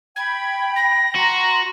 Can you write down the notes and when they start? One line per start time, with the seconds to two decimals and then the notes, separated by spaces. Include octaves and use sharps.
0.16 G5 B5 G#6
0.76 A#6
1.16 F#4 A#5 C6